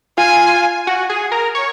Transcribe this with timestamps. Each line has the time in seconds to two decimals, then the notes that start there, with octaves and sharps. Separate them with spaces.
0.18 F4 G#5
0.87 F#4
1.10 G#4
1.32 A#4
1.55 C#5